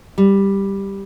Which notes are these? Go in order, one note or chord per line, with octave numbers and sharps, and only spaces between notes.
G3